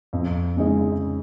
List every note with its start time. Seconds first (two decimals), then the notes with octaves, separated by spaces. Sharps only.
0.13 F2
0.57 C#3 G#3 D#4 G#4